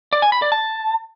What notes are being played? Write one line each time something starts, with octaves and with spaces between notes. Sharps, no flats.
D5
G#5
B5
D5
A5